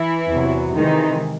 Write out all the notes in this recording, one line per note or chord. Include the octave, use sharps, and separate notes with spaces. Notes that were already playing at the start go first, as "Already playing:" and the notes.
Already playing: E3 E4
E2 C3 F#3
C3 D#3 E3 G#3 D#4